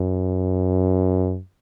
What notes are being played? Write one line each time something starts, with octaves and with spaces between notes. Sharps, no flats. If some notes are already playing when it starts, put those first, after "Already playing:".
Already playing: F#2